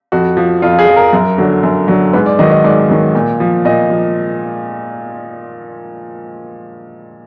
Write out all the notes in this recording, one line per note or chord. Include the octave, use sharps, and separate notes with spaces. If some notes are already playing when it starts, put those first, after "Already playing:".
F2 F#4
F3
F2 F4
G#4
F3
A#4
F#2
D3 F#3
F#2
D3 F#3
G#2 B4
D5
D#3 F#3 D#5
D#5
G#2 D5
D#3 F#3
A#2
F3
A#2 D#5
F3